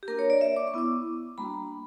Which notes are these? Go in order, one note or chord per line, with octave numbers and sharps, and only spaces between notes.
G4
A#3 D4 F#4 A#4
C#5
D5
E5
D6
C#6
B3 E4 D6
G3 A#3 D4 F#4 B5